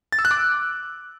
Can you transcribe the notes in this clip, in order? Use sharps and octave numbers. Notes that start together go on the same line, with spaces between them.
A6
E6
F#6
D6